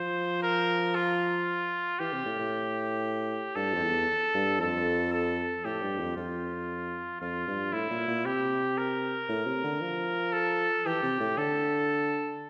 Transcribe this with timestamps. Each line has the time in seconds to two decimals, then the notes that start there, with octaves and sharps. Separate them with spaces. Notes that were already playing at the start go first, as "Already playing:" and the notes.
Already playing: F3 C5
0.43 A#4
0.95 F4
1.99 E3 G4
2.12 C3
2.26 A2
2.39 A2
3.55 G2 A4
3.74 F2
3.82 E2
4.34 G2
4.60 F2 A4
5.12 A4
5.64 A2 G4
5.82 G2
5.99 F2
6.16 F2 F4
7.21 F2 F4
7.47 G2
7.73 A2 E4
7.90 A#2
8.07 A#2
8.25 C3 G4
8.78 A#4
9.29 A2
9.46 C3
9.64 D3
9.81 F3
10.33 A4
10.85 E3 G4
11.03 C3
11.20 A2
11.38 D3 A4